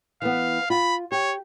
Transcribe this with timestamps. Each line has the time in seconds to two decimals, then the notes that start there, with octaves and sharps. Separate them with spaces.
0.22 E3 B3 F5
0.70 F4 B5
1.12 G4 C#5